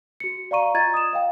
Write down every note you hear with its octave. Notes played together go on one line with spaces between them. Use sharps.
F#4 C#7
D5 F5 A#5 C#6 D#7
F4 D#5 A#5 G#6 A6
D#6 E7
D#5 F5 G5